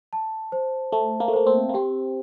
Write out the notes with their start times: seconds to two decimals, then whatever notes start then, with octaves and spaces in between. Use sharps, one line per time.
0.13 A5
0.52 C5
0.92 A3 A5
1.20 A#3
1.28 A3
1.33 A#3 C5
1.47 C4
1.69 A#3
1.74 C4 G4